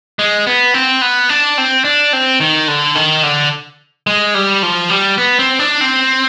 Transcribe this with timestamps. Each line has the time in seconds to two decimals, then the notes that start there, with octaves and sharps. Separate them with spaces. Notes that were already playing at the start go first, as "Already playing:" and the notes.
0.19 G#3
0.47 B3
0.74 C4
1.02 B3
1.29 D4
1.58 C4
1.84 D4
2.13 C4
2.40 D#3
2.68 D3
2.95 D#3
3.23 D3
4.07 G#3
4.34 G3
4.63 F3
4.90 G3
5.18 B3
5.39 C4
5.59 D4
5.81 C4